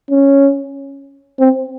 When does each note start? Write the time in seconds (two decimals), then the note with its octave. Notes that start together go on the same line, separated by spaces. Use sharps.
0.11 C#4
1.40 C4